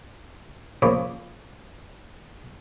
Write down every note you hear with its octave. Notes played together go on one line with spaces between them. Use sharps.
C#3 F3 A#3 B5 C#6 D6